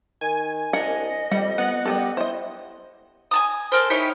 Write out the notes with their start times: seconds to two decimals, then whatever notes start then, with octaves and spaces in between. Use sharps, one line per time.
0.21 D#3 G#5
0.73 C2 D4 A#4 D#5 F#5
1.31 F2 G3 F#5
1.58 B3 F#5
1.85 G3 B3 G4 A4
2.17 E4 C5 D#5
3.31 G#5 A5 D#6
3.72 A4 A#4 C5
3.90 D#4 E4 G4 C#5